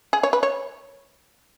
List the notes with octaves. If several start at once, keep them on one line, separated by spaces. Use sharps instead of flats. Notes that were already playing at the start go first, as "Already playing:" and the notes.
G#4
C#5
B4
C#5